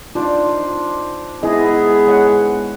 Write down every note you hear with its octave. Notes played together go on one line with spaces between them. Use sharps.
D4 D#4 F4 C5
G#2 B3 E4 G#4 D#5
G#3 C#5 F#5